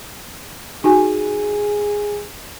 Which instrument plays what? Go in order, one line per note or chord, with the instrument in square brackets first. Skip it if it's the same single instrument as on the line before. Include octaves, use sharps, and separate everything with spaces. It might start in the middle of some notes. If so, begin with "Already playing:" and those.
[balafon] D#4 F#4 G#5 [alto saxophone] G#4